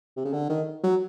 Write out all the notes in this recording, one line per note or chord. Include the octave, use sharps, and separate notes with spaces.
C3
C#3
D3
D#3
F#3